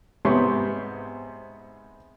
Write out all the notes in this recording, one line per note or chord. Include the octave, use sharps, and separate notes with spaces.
G#2 C3 B3 C#5 C6 C#6